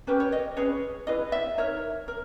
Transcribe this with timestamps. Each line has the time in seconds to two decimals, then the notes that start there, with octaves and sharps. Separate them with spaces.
0.07 C#4 G4 A#4 B4
0.20 C#5
0.32 D#5
0.57 C#4 G#4 B4 C#5
1.07 E4 G#4 B4 D#5
1.32 E5
1.58 D#4 A#4 C#5
2.08 A#4